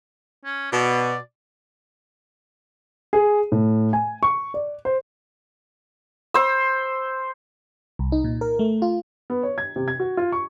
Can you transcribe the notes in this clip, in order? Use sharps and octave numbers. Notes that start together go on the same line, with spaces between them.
C#4
B2 D5
G#4
A2
G#5
C#6
D5
C5
C5 E6
C2
D#4
A#2
A#4
A3
F4
B3
C#5
G#6
C3
G#6
F#4
F4
C#6